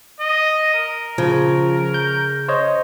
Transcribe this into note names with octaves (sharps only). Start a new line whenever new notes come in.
D#5
A#4
C#3 F3
G6
C5 C#5 D#5